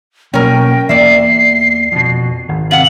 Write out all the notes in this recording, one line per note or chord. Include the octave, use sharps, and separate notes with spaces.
B2 F#3 A#3 C#4 A#4 G5
E2 A#3 D5 E5 C7
F2 B2
G#1
C3 F5 F#5 F#7